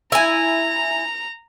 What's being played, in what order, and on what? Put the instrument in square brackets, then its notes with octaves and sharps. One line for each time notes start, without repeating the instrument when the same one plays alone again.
[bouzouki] E4 G#5 [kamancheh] A#5